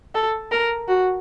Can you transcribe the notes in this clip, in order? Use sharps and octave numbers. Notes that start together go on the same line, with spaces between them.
A4
A#4
F#4